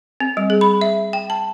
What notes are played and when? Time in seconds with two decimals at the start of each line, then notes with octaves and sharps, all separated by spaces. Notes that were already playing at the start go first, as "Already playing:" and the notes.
0.20 C4
0.37 G3
0.50 G#4
0.61 B5
0.81 E5
1.13 G5
1.30 A5